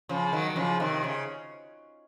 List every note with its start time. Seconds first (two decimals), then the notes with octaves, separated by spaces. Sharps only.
0.09 C#3 F3
0.33 D#3 F#3
0.50 D#3
0.56 C#3 F3
0.80 C3 D#3
1.04 C#3